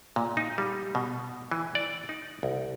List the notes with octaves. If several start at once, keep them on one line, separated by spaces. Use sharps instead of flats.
A#2
D#4
G3
B2
E3
D5
D#4
C2